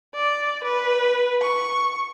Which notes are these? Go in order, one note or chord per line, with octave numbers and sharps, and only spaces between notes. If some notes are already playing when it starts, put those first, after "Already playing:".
D5
B4
C#6